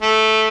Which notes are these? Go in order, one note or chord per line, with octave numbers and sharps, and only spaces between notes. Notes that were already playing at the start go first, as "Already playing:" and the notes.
A3